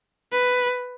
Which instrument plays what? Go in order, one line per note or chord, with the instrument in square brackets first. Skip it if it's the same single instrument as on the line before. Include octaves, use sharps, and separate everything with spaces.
[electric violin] B4